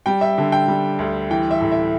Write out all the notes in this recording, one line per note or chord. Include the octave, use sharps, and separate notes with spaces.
G3 G5
E5
D3
G5
G3
D2
E3 G5
E5
A2
E5